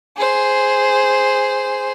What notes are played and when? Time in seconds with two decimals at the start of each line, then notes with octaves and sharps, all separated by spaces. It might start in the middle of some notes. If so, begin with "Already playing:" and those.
0.17 G#4 C5